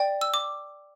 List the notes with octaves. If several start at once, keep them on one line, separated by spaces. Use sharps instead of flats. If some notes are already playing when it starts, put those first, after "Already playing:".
Already playing: D5 G5
E6
D6